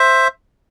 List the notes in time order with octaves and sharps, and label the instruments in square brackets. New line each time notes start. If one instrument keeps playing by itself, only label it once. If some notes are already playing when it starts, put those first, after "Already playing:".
Already playing: [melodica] C5 E5